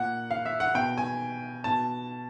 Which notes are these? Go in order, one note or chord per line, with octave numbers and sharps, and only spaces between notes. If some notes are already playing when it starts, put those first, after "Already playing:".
Already playing: A#2 F#5
F5
E5
F#5
B2 G5
G#5
B2 A5